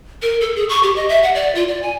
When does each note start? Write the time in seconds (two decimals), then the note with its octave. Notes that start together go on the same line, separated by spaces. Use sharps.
0.22 A#4
0.41 A4
0.56 G#4
0.69 C#6
0.83 G4
0.96 D#5
1.09 E5
1.23 F#5
1.35 D5
1.55 F4
1.68 D5
1.83 G#5